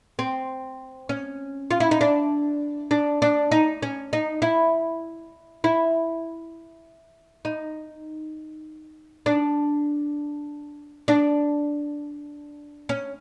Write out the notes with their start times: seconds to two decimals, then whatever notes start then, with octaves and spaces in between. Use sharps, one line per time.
0.19 C4
1.09 C#4
1.71 F4
1.80 E4
1.91 D#4
2.01 D4
2.91 D4
3.22 D4
3.51 D#4
3.82 C#4
4.13 D#4
4.42 E4
5.64 E4
7.45 D#4
9.26 D4
11.08 D4
12.89 C#4